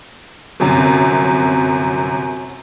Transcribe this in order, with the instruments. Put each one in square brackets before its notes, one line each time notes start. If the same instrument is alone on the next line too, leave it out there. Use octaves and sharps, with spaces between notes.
[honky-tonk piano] G1 F#2 C3